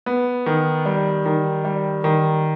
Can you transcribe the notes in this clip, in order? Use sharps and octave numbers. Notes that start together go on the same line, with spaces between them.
B3
D#3
G3
D#3
G3
D#3